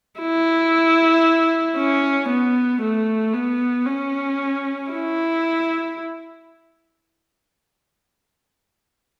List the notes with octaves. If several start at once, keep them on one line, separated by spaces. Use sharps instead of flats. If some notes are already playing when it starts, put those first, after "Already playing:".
E4
C#4
B3
A3
B3
C#4
E4